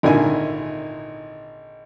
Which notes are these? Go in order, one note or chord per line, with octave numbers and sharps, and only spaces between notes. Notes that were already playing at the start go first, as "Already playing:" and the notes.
G#1 A#2 D3 D#4 E4 G#5